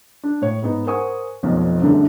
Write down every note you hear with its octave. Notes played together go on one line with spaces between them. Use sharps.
D4
A2 C#5
G#2 B3 D#4
A#4 C5 F#5 G#5 C#6 D#6
F1 B1 F2 F3
C2 F#2 D3 G#3 A3